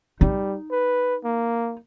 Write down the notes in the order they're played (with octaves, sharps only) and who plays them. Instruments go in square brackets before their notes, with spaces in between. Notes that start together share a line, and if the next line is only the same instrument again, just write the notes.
[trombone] G3 [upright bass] D#4
[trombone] B4
A#3